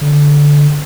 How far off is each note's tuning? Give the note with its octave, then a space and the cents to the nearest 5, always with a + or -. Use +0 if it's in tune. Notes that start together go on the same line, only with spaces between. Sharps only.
D3 -10